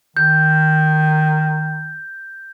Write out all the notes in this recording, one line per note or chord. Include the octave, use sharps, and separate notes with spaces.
D#3 G6